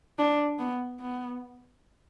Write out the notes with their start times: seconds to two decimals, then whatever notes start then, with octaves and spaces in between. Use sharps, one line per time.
0.19 D4
0.59 B3
1.00 B3